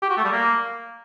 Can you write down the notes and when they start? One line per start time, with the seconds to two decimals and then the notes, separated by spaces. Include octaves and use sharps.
0.02 G4
0.10 F#4
0.17 A3
0.25 G3
0.32 A#3